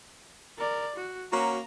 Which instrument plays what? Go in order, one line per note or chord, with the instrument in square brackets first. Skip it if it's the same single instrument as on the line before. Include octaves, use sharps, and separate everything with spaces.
[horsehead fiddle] A#4 D5
F#4
[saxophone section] A#3 C#4 F#4 [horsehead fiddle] A#5